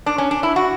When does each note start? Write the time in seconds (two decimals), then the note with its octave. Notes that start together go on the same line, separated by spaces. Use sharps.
0.06 D4
0.18 C#4
0.31 D4
0.43 E4
0.56 F#4